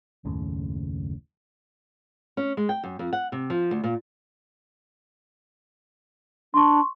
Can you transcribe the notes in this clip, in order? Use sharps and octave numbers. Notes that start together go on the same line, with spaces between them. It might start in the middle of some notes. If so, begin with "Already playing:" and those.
F#1 D#2 A2 C#3
C#4
G#3
G5
F#2
F2
F#5
C3
F3
D2
A#2
D4 C6 C#6